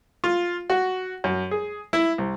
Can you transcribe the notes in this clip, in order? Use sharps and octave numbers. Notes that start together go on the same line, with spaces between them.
F4
F#4
F#2
G#4
E4
C2